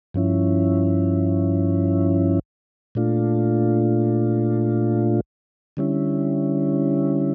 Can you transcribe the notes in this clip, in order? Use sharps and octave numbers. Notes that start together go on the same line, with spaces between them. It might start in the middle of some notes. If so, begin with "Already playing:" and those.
G2 F3 C#4 E4
A#2 A3 D4 F4
D3 G3 C#4 E4